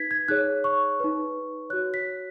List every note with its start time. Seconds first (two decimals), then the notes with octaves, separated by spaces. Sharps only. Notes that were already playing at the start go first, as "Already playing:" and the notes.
Already playing: D#4 B4 G#6 B6
0.11 G#6
0.28 D#4 G#4 C#5 F#6
0.64 C#6
1.00 D#4 B4
1.70 F#4 C#5 F#6
1.94 B6